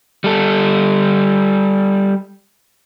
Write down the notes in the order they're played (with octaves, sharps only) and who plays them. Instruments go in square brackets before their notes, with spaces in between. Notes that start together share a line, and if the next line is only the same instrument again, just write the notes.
[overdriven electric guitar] G3 A4